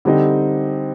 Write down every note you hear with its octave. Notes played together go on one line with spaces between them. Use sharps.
D3 G3 C4 D#4